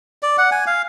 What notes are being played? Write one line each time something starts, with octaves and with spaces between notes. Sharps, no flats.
D5
F#5
G#5
F5